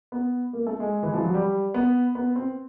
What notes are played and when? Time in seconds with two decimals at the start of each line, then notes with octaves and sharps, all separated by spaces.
0.12 B3
0.53 A#3
0.67 A3
0.80 G#3
1.03 E3
1.14 F3
1.24 F#3
1.34 G3
1.74 B3
2.15 B3
2.36 C4